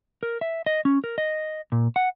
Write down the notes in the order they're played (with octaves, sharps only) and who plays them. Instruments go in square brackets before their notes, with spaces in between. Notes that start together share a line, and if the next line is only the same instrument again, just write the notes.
[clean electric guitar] A#4
E5
D#5
C#4
A#4
D#5
A#2
F#5